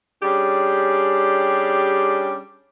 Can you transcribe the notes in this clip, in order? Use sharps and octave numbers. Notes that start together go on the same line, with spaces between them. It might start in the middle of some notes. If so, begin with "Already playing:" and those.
G3 C#4 D4 G4 G#4